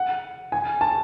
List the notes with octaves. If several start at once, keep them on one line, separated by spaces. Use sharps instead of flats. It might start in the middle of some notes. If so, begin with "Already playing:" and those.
Already playing: F#5
G#5
A5